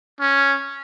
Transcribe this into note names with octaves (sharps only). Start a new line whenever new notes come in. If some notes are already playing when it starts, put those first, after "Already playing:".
C#4